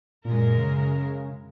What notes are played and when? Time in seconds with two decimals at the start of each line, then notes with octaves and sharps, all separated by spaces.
0.25 F#2 A#2 G#3 A#4
0.58 C#3